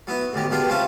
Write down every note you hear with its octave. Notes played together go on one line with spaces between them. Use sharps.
F#3 B3 E4
A1 D2 B2 G4
C#2 B2 A#3 D4 G4 C6
C4 C#4 E4 F4 A5